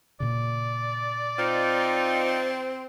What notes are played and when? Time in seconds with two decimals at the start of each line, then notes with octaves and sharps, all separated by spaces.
0.20 A#2 C#3 D5
1.39 C4 D#4 F4